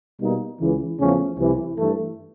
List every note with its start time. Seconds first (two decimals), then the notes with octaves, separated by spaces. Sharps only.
0.21 B2 G3 A#3 D#4
0.60 C#2 C#3 E3
0.99 E2 C#3 F3 A3 C#4
1.39 C2 C3 E3
1.78 G2 E3 A3